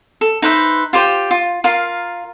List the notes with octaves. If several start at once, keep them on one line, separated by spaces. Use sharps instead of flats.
A4
D#4 B4 C5 E5
F4 G4 C5 G5
F4
F4 A#4 F5